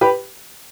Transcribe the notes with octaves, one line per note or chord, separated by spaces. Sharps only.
G4 B4